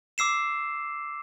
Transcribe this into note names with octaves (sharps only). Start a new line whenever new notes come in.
D6 E6 C7 E7